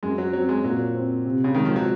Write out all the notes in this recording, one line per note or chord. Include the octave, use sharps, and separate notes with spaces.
F#2 G#3
F#3
F#3 C4
G#3
A#2 F#3
C4
C3
C#3
D#3 G#3
F3
F#3